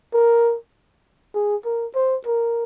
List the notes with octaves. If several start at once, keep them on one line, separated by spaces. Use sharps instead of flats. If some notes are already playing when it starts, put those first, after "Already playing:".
A#4
G#4
A#4
C5
A#4